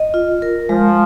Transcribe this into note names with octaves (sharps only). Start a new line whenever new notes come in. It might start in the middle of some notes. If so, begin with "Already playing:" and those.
Already playing: D#5
F4
A#4
F3 G#3